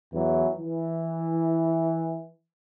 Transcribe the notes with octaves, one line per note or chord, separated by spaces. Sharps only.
E2 E3 F#3
E3